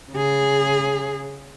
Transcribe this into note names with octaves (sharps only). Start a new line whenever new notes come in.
C#3 G#4